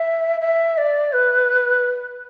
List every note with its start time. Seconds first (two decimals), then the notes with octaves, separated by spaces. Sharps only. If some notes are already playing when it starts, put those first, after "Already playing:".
Already playing: E5
0.41 E5
0.77 D5
1.13 B4